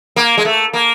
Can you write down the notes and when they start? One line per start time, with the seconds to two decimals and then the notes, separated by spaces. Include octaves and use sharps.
0.16 A#3
0.38 G#3
0.45 A3
0.73 A#3